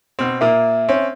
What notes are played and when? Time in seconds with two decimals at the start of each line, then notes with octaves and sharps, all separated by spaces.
0.19 B2 C4
0.41 A#2 A#3 E5
0.89 C4 C#4